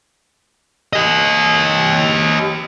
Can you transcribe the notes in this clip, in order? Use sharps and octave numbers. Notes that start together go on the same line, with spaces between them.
G4 D#5